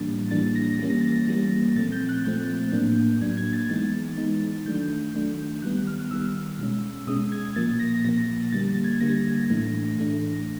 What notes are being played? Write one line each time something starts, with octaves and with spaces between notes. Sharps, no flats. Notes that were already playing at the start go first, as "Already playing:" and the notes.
Already playing: A2 E3 G3 A#3 D4 A6
A2 E3 G3 A#3 D4 A6
A#6
E3 G3 A#3 C#4
A#6
A6
A#6
E3 G3 A#3 C#4
A#2 F3 A3 C4 A6
G6
F#6
A#2 F3 A3 C4 G6
A2 F#3 A#3 D4
A2 F#3 A#3 D4 G#6
G#6
A6
E3 G#3 B3 D#4 A6
E3 G#3 B3 D#4
D#3 F#3 A3 D4 G6
D#3 F#3 A3 D4
D#3 G3 B3 F#6
F6
F6
D#3 G3 B3 E6
B2 G#3 C#4
B2 G#3 C#4 D#6
G#6
A#2 F3 A#3 A6
A#6
A#2 F3 A#3 A#6
A#6
D3 G3 A#3 A6
A6
G#6
D3 G3 A#3 A#6
A2 E3 A3 D4
A2 E3 A3 D4